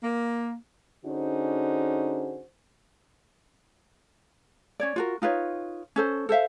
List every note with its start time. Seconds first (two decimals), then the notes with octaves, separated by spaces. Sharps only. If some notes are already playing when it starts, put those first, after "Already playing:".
0.03 A#3
1.06 D3 C#4 D#4 F#4 G#4 C5
4.80 C#4 C#5 D5
4.96 F4 F#4 A#4
5.22 D#4 F4 B4 C#5
5.96 C#4 A4 C5
6.29 A4 C5 E5 F5